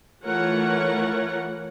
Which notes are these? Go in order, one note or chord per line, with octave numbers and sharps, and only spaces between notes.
E3 A3 F4 A#4 C#5 F#5